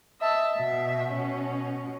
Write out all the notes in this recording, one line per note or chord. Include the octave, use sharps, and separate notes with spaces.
D#5 E5 A5
B2 E5
B2 C#4